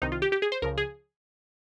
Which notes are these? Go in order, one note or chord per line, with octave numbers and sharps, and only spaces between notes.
C2 C3 D#3 D#4
F4
G4
G4
G#4
C5
C#2 C#3 F3 A#4
G#4